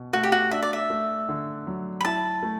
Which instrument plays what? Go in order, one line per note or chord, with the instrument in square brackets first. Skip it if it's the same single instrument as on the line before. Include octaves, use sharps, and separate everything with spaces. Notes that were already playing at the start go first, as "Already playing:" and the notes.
Already playing: [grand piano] B2
[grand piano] A3 [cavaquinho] F#4
[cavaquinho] G4
F#4
[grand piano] D4 [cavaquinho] E5
[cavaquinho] D5
E5
[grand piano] A3
D3
F#3
[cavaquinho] B5
[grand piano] E4 [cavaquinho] A5
[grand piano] A3